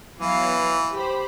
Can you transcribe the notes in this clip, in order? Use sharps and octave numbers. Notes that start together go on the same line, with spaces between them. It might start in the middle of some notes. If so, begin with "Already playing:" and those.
E3 F#3 B3 F5
G4 C5 B5